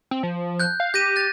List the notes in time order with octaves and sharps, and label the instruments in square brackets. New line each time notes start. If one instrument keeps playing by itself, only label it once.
[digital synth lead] C4
F3
[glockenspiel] F#6 G6
[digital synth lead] F5
[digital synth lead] G4 [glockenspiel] G6 A#6 D#7
[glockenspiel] F#6 A6